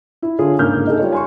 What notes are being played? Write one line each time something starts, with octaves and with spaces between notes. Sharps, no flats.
E4
D3 F4 G#4 C#5
G1 G#2 C#3 A#3 F6 G6
D#4 G#4 A4
G3 F4 G4 C#5
G#5 C6 C#6